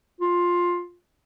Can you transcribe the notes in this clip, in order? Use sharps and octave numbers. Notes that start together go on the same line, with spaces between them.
F4